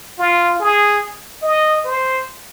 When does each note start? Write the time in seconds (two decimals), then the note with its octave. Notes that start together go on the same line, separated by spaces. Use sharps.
0.18 F4
0.60 G#4
1.42 D#5
1.85 C5